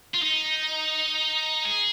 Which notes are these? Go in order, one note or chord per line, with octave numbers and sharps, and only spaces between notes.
F4
D#4
G#4